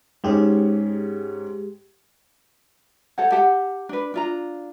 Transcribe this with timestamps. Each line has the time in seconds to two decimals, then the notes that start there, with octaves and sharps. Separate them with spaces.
0.24 G#2 G#3 C#4 G4 G#4
3.18 A4 C5 C#5 F#5
3.32 G4 F#5 A5
3.89 D4 B4
4.14 D4 F4 A#5